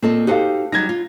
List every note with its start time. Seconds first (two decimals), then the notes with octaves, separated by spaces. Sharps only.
0.03 A#2 C4 A4 D#5
0.27 D#4 F#4 G4 A4 C5 F5
0.72 F#3 G3 D#4 G#6 A#6
0.89 F4